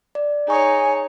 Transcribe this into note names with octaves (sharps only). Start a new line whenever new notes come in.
D5
D#4 G#4 C#5 G#5 C#6 D#6